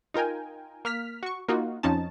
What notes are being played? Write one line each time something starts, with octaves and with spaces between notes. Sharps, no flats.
D#4 F4 A#4 G5 G#5
A#3 F6 B6
F#4 C#6
A#3 D#4 F4 F#4
F2 F3 C#4 D#4 A5